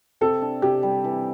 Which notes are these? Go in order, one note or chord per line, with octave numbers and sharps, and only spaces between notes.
C3 A4
D4
C3 G4
G3
E3